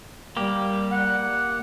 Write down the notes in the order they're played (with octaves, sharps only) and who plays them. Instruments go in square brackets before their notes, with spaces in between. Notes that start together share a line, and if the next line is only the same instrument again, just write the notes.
[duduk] G3 [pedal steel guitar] A#3 G4
[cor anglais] F#5